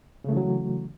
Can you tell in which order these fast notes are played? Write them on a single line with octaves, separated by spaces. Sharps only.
C#3 A3 E3 F#3